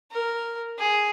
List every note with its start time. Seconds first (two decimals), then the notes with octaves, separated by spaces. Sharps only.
0.12 A#4
0.78 G#4